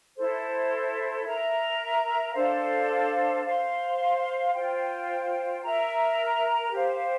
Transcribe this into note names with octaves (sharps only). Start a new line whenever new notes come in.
E4 A4 C5
A#4 E5 A#5
D4 A4 C5 F5
C5 F5 C6
F4 C5 G5
A#4 E5 A#5
G4 C5 F5